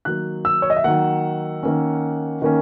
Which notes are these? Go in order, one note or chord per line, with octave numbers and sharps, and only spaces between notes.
D#3 F#3 A#3 F#6
E6
C#5
D#5
E5
D#3 F#3 A#3 F#5
D#3 A#3 C#4
D#3 A#3 C#4